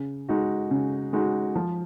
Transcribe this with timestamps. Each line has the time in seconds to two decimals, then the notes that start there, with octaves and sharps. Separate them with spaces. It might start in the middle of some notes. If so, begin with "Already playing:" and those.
Already playing: C#3
0.29 G#3 D#4 F#4
0.71 C#3
1.13 G#3 D#4 F#4
1.55 F3